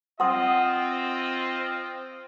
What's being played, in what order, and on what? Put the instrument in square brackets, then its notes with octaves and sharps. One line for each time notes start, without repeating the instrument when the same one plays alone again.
[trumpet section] C4 F4 D#5 [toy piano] F#5 C6 D#6